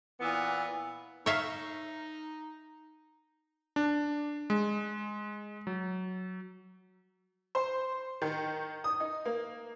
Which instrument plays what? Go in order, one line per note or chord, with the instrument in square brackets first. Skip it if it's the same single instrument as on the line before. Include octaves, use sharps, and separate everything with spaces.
[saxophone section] A#2 E3 B3
[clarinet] D#4 [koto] C#5 E5 F5
[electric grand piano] D4
G#3
F#3
[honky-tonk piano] C5
D#3
D#6
D#4
A#3